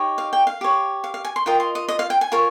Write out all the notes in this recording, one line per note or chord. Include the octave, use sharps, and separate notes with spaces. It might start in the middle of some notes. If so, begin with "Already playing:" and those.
Already playing: D#4 G4 C#5
F5
G5
F5
G4 C#5
F5
F5
G#5
C6
F4 A#4 D#5 G5
C6
D#5
D#5
F5
G5
G#5
F4 A#4 C#5